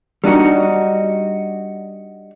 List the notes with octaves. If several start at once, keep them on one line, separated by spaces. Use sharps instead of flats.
G3 D4 D#4 F#4